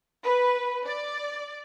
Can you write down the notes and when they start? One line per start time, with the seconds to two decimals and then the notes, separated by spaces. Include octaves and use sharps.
0.24 B4
0.85 D5